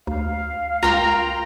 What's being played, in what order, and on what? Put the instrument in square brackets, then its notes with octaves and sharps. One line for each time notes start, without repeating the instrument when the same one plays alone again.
[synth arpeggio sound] D2 [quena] F5
[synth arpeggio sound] C#2 F4 [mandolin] A#4 G5 C6 [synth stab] A#5